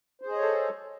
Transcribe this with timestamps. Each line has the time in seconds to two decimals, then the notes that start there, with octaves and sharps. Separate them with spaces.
0.22 C5
0.27 G#4
0.32 D#5
0.37 C#5
0.42 A4